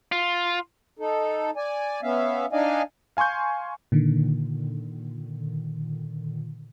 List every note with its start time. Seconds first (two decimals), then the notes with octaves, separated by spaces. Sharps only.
0.12 F4
0.99 D#4 A4
1.57 D5 G#5
2.03 B3 C#4 E5 F5
2.53 D4 D#4 D5 D#5 F5 G#5
3.17 F5 G#5 C6 C#6 G6
3.92 A#2 D3 D#3